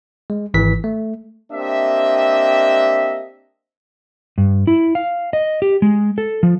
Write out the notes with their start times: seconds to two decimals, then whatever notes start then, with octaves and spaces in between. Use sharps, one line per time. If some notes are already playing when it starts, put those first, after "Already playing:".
0.30 G#3
0.54 G#1 E3 B6
0.84 A3
1.52 A#3 C4 D4 G4 D#5 E5
4.38 G2
4.67 E4
4.95 F5
5.33 D#5
5.62 G4
5.82 G#3
6.18 A4
6.43 F3